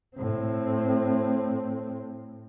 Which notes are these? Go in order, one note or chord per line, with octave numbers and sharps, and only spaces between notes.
A2 C4